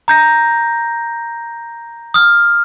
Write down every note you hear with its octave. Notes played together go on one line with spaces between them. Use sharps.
A#5 G6 A#6
D#6 F6